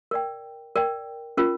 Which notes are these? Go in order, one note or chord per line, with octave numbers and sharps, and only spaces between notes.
A#4 D5 G5
A#4 D5 G5
C#4 F4 A#4